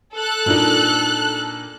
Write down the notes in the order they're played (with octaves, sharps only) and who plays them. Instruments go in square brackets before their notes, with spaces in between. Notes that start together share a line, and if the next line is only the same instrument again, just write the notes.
[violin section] A4 F#6
[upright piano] A#2 D4 D#4